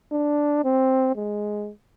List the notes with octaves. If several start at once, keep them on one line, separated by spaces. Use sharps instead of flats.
D4
C4
G#3